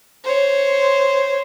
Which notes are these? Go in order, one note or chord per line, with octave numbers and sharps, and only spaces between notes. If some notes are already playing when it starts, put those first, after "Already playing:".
C5 C#5